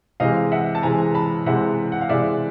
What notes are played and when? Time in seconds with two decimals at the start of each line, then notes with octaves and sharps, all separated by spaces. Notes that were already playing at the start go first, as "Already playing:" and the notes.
0.20 C3 E3 G#3 D#5 F5
0.52 E5 F#5
0.75 A5
0.83 C3 E3 G#3 G#5 A#5
1.15 A5 B5
1.46 C3 E3 G#3 E5 F#5
1.92 F#5
2.01 F5
2.09 C3 E3 G#3 D5 E5